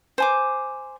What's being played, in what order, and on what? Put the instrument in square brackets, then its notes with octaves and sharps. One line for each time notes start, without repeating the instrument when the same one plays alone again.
[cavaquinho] C5 G#5 D6